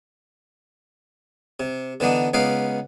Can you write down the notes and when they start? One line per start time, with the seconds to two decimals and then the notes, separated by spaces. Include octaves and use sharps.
1.60 C3
2.00 D3 E3 B3 D4 D#4
2.33 C#2 B3 D#4 B4 F5 D6